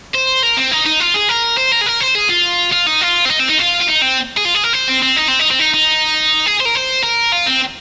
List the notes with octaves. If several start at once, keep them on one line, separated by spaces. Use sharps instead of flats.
C5
A#4
C4
D#4
D#4
F4
G#4
A#4
C5
A#4
G#4
A#4
C5
G#4
F4
F4
D#4
F4
C4
D#4
C4
D#4
F4
F4
D#4
C4
G#4
F4
G#4
A#4
C5
C4
C4
D#4
C4
D#4
C4
D#4
D#4
G#4
C5
A#4
C5
A#4
F4
C4